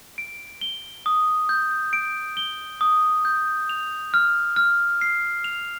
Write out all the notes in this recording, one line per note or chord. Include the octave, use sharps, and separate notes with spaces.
D7
G7
D#6
G6
D7
G7
D#6
G6
F7
F6
F6
C7
F7